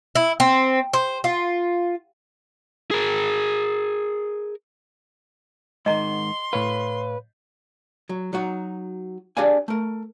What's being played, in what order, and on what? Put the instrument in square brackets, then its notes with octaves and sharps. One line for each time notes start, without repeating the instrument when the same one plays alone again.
[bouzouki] E4
C4
C5
F4
[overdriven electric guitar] G#4 A#4
[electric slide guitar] G#2 D#3 [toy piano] D#5 A#5 [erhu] C6
[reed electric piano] A2 C#5 F5 [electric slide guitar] B4
[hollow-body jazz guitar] F#3
F#3 D#4 F#4
D4 G4 G#4 D5 F5 G#5
A3 A#4